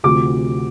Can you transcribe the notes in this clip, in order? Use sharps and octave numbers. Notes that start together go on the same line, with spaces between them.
D2 C3 F3 D6